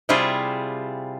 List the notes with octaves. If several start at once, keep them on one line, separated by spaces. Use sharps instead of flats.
C3 G3 E4 F4 G#4